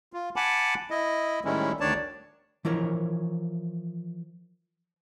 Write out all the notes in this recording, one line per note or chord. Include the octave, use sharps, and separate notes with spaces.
F4
F#5 G#5 A5 B5 D6
E4 D#5
A2 D#3 G3 G#3 C#4 E4
D2 D#3 D4 C#5 D5 A5
E3 F3 E4 A#4 C#5